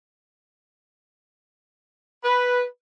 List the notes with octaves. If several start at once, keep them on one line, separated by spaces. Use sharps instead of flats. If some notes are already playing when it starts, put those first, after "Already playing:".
B4